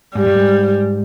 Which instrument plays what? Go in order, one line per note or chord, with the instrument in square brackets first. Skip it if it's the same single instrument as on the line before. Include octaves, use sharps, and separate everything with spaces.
[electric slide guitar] G#2 [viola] G3
[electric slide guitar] G2
G#2